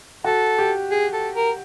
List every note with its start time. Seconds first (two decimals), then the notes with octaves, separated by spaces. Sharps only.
0.24 F#4 A4
0.58 G4
0.91 G#4
1.13 A4
1.35 A#4